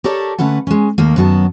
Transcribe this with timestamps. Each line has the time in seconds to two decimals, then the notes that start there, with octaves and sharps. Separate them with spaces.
0.04 G4 A4 A#4 C#5 D5 A5
0.38 D3 A3 C#4 B4 F#5
0.67 G#3 C#4
0.98 D#2 D#3 A3 A#3
1.16 F#2 D#3 F#3 B3 B4 A5